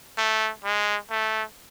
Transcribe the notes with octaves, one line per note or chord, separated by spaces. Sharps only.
A3
G#3
A3